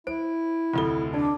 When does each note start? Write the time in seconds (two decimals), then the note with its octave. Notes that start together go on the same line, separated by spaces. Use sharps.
0.07 E4 C5 D7
0.74 F1 D2 F4 A4 G7
1.14 D4 D5 A5